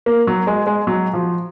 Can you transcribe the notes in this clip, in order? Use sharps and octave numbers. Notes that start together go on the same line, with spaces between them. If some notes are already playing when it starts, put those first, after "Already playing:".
A#3
F#3
G#3
G#3
F#3
F3